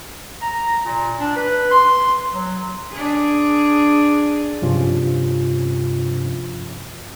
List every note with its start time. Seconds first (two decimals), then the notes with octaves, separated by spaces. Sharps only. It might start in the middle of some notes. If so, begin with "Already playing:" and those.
0.42 A#5
0.85 A#2
1.20 D4
1.36 B4
1.70 C6
2.33 F#3
2.92 D4 G#4
4.62 G2 C3 F3 C#4 F4